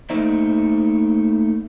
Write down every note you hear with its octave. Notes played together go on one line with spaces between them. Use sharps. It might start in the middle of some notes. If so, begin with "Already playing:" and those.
A3 A#3 D#4 C5 D5 D#5